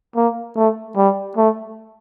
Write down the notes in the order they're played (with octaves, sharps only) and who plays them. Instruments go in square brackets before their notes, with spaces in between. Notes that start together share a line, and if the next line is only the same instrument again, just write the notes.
[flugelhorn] A#3
A3
G3
A3